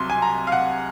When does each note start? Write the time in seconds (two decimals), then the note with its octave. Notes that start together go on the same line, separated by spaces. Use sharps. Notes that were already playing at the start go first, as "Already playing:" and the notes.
Already playing: C2 C3 F#3 C6
0.10 G#5
0.22 A#5
0.47 F5
0.52 F#5